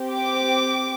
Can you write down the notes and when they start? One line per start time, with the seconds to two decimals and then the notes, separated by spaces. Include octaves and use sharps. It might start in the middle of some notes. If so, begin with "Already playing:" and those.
Already playing: C4 G4
0.13 D6